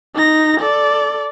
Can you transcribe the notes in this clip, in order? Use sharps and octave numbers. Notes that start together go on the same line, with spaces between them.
D#4 A#6
A4 D5